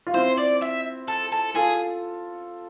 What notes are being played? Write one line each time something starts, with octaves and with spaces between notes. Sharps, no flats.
F4
C4 E4 C5
D5
E5
A4
A4
F4 G#4 A4